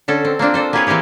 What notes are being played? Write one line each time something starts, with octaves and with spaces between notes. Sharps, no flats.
D3 C#4 A4
C4
A#3 C4 D4 F4
D4 A4 C5
A#3 E4 G4 G#4 B4 C#5
E3 A#3 C4 G4 G#4